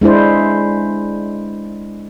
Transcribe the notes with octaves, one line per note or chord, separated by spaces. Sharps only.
G#3 D4 E4 C5